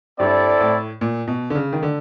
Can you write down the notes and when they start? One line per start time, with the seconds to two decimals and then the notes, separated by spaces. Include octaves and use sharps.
0.20 G2 C4 E4 A4 D5
0.61 A2
1.01 A#2
1.27 B2
1.50 D3
1.55 C#3
1.73 D#3
1.83 D3